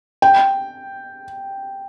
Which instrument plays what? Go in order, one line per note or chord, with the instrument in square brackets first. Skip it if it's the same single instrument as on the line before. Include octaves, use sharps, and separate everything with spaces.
[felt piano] G5